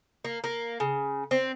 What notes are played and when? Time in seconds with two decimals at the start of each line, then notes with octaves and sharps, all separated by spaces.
0.25 A#3
0.44 A#3
0.80 C#3
1.31 C4